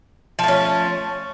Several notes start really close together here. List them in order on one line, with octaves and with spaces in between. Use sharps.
F3 A3 C#4